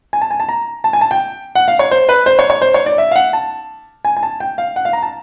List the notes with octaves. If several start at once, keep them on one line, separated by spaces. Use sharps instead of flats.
G#5
A5
G#5
A5
A#5
A5
G#5
A5
G5
F#5
F5
C#5
C5
B4
C5
C#5
C#5
C5
C#5
D5
E5
F5
F#5
A5
G#5
G#5
A5
G5
F5
F#5
F5
A#5
A5